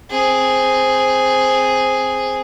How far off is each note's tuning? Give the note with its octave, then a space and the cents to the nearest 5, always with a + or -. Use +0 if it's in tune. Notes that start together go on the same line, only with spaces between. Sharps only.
C4 +0 G#4 +0